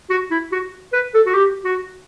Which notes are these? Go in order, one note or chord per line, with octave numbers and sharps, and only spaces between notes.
F#4
E4
F#4
B4
A4
F#4
G4
F#4